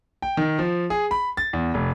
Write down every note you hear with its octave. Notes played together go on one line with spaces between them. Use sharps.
G5
D#3
F3
G#4
B5
A6
E2
F1